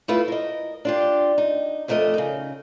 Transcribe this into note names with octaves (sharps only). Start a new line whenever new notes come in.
A3 B3 E4 F4 B4
A#4 D#5
D4 F4 G4
D#4
F2 D3 A3 A#4 D#5
C#3 D#4